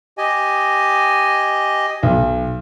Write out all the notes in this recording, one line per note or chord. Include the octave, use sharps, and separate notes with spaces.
G4 D#5 G#5
B1